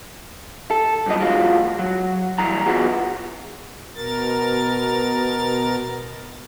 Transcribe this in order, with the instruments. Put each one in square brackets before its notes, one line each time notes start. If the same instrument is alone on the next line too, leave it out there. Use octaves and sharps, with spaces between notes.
[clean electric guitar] A4
C2 G2 F3 F#3 D#5
E3 G#3 F4 F#4
F#3
G2 E3 A#5
B3 F4 F#4 G#4
[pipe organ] B2 A#4 A6